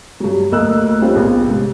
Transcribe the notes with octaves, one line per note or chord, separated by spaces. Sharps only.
G2 F#3
D2 A#3 D#5 E6 F#6
G3 C4 C#4 F4
A#1 B3
G#2 C3